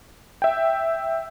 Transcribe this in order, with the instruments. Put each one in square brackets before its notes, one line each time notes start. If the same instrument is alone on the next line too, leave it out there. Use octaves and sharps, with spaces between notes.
[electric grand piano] E5 G5